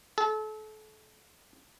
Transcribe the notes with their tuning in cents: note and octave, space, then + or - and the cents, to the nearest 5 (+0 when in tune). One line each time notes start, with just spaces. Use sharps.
A4 -35